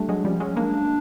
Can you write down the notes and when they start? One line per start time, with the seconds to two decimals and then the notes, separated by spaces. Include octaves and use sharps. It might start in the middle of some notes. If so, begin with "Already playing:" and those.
Already playing: G3 A3 D4
0.09 F#3 G#3
0.24 F3 G3 C#4
0.40 F#3 G#3
0.56 G#3 A#3 D4